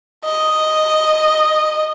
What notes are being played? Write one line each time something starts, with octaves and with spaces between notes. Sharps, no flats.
D#5